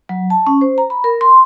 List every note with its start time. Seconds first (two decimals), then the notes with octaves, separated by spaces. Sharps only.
0.09 F#3
0.30 A5
0.47 C#4
0.61 C5
0.78 A#5
0.90 B5
1.04 A#4
1.21 C6